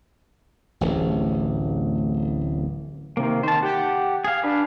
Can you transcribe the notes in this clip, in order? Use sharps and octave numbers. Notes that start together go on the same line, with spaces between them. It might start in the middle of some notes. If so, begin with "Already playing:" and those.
D1 A1
C3 D#3 A#3
D#3 C5 A5
G4 F#5
G#4 F5
D4 B4 F5